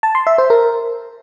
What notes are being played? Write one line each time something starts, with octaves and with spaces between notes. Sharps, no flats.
A5
C6
E5
C5
A#4